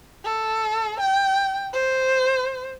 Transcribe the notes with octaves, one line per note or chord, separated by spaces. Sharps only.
A4
G5
C5